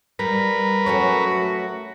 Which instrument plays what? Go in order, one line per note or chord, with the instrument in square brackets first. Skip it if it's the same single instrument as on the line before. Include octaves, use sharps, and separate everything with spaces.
[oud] G3 [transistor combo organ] A#4 B4
[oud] F#3 A3 C#4 [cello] F#4